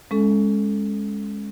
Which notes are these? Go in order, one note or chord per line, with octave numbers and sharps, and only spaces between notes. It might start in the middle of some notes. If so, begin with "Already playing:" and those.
G#3 C#4 A4